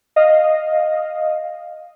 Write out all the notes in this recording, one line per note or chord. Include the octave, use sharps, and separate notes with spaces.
D#5 F5